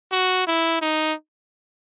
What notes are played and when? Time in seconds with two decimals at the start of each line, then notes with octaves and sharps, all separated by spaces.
0.12 F#4
0.47 E4
0.82 D#4